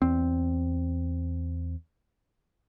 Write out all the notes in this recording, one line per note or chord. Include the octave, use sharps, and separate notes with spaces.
E2 C4